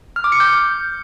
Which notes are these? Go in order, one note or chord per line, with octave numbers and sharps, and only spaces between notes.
F6
D6
C#7
G6